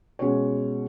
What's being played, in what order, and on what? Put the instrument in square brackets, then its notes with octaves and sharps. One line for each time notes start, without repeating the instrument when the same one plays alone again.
[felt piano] B2 G#3 C#4 F#4 C#5